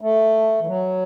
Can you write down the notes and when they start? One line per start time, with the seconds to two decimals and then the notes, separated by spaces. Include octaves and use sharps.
0.01 A3
0.61 E3
0.67 F#3